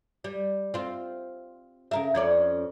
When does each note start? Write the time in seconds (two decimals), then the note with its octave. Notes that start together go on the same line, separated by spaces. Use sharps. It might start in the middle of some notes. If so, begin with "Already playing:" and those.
0.24 G3
0.74 C4 F4
1.91 C#3 A#4 E5
2.15 F2 C#4 D5